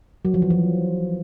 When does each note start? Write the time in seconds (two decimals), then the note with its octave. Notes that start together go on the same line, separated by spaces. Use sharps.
0.25 F#3
0.34 F3
0.42 E3
0.50 F3